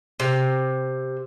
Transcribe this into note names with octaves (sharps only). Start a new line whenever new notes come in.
C3